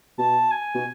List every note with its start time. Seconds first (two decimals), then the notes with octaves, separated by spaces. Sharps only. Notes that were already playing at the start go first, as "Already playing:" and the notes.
0.18 B2 A5
0.51 G#5
0.75 B2